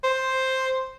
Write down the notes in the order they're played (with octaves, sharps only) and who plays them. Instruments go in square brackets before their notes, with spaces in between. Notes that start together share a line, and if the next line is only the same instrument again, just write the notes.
[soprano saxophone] C5